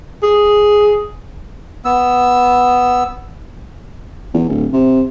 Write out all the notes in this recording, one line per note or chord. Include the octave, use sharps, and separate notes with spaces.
G#4
B3 E6
E2
D1
C3